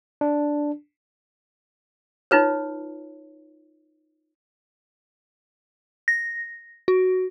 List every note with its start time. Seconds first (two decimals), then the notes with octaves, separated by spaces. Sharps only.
0.21 D4
2.31 D#4 F4 B4 C#5
6.08 A#6
6.88 F#4